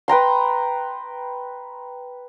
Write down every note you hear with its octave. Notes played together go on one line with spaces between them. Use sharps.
B4 G5 A#5 C6